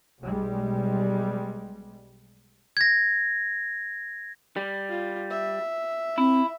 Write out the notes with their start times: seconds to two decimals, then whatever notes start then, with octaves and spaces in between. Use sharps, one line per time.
0.22 B1 G3 G#3
2.77 G#6 A#6
4.56 G3
4.90 F4
5.30 E5
6.18 C4 E4